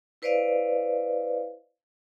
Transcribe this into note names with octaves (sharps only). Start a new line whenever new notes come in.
E4 B4 C5 D5 D#5 F5